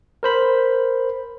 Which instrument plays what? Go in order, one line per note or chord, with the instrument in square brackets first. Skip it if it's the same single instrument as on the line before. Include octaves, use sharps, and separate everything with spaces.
[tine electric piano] A#4 C5 B5